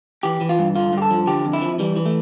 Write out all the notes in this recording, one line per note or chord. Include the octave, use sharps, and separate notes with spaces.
E3 G4
E3
F4
G2
D3 F4
G2 G4
A4
F3
D3 G4
F2
E4
F3
E3 G3
E3
A3